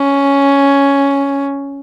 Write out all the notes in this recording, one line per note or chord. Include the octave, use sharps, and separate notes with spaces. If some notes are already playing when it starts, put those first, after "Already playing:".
Already playing: C#4